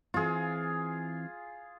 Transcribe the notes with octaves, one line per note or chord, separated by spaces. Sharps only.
E3 C4 F4 G#4